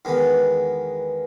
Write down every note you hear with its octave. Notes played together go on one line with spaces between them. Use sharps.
E2 D#3 G#3 B3